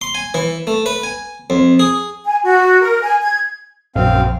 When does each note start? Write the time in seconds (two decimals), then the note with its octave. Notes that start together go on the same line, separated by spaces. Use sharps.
0.02 C6
0.15 G#5
0.34 E3
0.67 A3
0.86 B4
1.04 G#5
1.50 F2
1.79 G#4
2.25 G#5
2.44 F#4
2.81 A#4
3.02 G#5
3.22 G#6
3.96 A#1 F#2 C4 F5